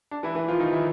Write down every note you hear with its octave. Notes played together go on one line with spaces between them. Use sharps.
D4
E3 E4
E3 E4
F3 F4
D#3 D#4
E3 E4